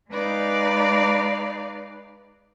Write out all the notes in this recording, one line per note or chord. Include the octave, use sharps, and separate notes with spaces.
G#3 D#4 B4 D5 F5